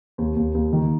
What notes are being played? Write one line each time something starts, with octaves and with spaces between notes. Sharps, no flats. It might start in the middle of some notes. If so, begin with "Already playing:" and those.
D#2
D#2
D#2
D#3